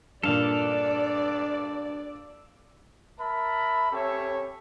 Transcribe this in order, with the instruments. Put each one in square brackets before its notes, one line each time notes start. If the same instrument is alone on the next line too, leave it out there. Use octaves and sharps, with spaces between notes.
[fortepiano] G2 A#2 [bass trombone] D4 [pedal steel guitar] A4 F5 [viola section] D5
[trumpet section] A#4 E5 A5 B5
C4 C#4 G4 A4 C#5 E5